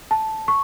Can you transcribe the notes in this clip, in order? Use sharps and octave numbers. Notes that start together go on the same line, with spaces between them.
A5
C#6